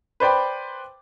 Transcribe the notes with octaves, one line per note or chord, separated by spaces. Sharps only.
B4 C5 D5 G5 B5